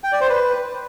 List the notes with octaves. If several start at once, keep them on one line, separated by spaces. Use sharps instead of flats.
G5
D5
C5
B4